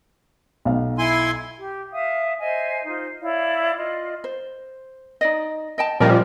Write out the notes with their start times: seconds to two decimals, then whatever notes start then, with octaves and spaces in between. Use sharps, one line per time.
0.65 B1 F5
0.98 E4 G#5 C6
1.59 G4
1.92 E5 F5 D#6
2.39 C5 D#5 E5 G#5
2.85 D#4 F4 C5
3.21 E4 C#5 D5 F5
3.77 F4 D5 D#5
4.24 C5
5.21 D#4 D5 D#5
5.78 D#5 G5 A5
6.00 A#2 F3 G3 C#4 A#4 D#5